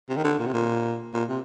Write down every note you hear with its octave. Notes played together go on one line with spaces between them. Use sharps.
C3
D#3
D3
A#2
C3
A#2
A#2
C3